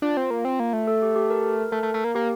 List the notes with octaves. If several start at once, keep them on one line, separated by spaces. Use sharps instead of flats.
D4 F4
C4
A#3
C4
A#3
A3
A4
G4
G4
A#4
A3
A3
A3
A#3
A#3 G4